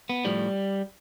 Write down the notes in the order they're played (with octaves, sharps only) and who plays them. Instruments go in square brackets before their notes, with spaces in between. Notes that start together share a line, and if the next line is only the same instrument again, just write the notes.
[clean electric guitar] B3
A2 F3 G3